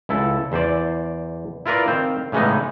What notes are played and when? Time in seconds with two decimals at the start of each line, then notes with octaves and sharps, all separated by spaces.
0.09 C#2 E4 A4
0.52 E2 C5 D5
1.66 E4 F4 A#4 B4 D5
1.88 D#3 C4 C5 F5
2.32 A2 C#3 E3 G#3 B3 D#4